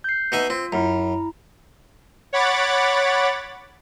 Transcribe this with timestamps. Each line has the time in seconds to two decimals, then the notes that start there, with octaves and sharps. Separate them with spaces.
0.04 G6 C7
0.32 B2 D#4 E5
0.50 C4 F4
0.72 F#2 E4 A#5
2.33 C#5 F#5 B5 D6 A6